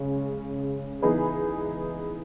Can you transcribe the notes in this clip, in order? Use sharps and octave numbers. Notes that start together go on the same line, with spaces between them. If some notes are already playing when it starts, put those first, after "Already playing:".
Already playing: C#3 G#3 C#4
E3 B3 D#4 G#4 B4